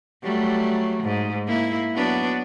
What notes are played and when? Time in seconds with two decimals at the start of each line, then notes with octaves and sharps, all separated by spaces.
0.23 F#3 G3 A3
1.03 G#2
1.47 A#3 E4
1.95 F#3 B3 D4